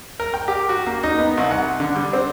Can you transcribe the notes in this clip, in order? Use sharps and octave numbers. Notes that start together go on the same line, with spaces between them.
A#4
G5
G4
F#4
A#3
D#4
B3
C2
F#5
D3
G3
C4